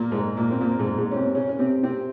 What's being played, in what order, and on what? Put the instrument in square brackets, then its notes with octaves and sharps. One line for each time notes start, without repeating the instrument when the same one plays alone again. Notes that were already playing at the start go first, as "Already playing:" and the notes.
Already playing: [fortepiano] A#2 A#3
G#2 G#3
A#2 A#3
C4
A#2 A#3
G#2 G#3
G#2 G#3
C#4
C3 C4
C#3 C#4
C#4
C3 C4
C3 C4